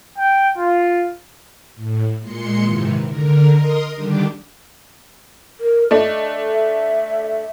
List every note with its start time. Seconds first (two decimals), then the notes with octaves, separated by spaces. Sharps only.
0.18 G5
0.57 F4
1.75 A2
2.20 A#2 G#3 C6 C#7
2.61 G#2 C3 D#3 E3
3.04 D3 A#4
3.55 A#4 D#5 C6 D#6
3.95 D3 D#3 G3 D4 G4
5.61 A#4
5.91 A3 D4 D#5
6.49 E5